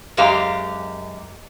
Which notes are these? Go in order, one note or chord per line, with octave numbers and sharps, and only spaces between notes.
F#2 G#3 G4 F5 A#5